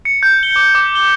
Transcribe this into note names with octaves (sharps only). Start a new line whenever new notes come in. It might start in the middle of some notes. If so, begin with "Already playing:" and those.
C#7
G6
G7
D6
D6
G7